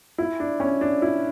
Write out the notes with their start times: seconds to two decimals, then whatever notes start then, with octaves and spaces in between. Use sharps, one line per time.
0.18 E4
0.40 D4
0.60 C#4
0.81 D4
1.02 E4